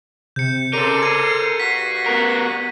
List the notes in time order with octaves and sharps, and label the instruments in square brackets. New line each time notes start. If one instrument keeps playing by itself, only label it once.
[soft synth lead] C3 [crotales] G6 C#7
[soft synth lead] C#3 [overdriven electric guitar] A4 A#4 [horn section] C5 D5 C6 [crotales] D#7
[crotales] G#6 D#7 [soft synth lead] C7
[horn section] G2 F#4 [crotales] B6
[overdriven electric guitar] B3 A#4